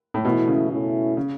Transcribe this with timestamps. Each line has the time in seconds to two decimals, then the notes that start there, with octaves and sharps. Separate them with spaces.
0.14 A2
0.25 B2 E3 A3 E4
0.48 C#3
0.71 B2 A3 C#4 E4
1.17 C#3